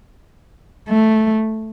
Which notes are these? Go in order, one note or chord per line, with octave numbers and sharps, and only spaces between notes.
A3